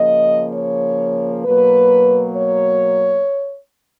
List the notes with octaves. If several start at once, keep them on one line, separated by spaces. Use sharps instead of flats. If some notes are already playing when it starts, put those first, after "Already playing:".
Already playing: C#3 F3 A#3 D#5
C#5
B2 F#3 A#3 B4
C#5